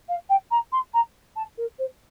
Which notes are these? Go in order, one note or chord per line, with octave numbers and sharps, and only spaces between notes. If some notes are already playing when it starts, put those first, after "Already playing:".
F5
G5
A#5
C6
A#5
A5
A#4
C5